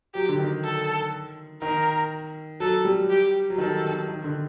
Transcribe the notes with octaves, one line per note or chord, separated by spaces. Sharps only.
F#3 G4
D3
D#3
A4
D#3 A#4
F#3 A4
G3
G4
F#3
D#3 A4
D#3
D#3
D3